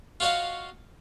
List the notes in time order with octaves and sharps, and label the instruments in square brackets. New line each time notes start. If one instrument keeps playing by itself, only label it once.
[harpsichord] F4 F#4 C#5 D#5 F5